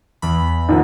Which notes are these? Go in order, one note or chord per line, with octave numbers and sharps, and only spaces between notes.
E2 E3 B5
A1 D#2 F3